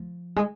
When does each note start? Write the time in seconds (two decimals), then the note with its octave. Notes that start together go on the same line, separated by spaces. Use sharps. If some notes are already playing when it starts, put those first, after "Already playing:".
Already playing: F3
0.36 G#3